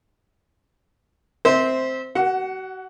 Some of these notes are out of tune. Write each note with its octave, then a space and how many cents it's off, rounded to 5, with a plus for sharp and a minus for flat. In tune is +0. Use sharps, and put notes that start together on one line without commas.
C4 +0 C5 -5 E5 -25
F#4 +35 F#5 +5